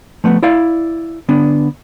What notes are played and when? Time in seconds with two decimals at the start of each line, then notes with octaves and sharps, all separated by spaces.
0.24 F3 A3 B3
0.43 E4 D5 F5
1.29 D3 B3 D4